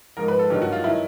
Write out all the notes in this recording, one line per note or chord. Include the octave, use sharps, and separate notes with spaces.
G#2 F3 A#4
B4
A4
G2 D#3 F#3 G4
F#4
F4
D#3 F#3 E4